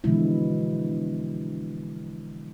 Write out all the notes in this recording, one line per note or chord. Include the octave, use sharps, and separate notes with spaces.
B2 D3 E3 F3 G#3 E4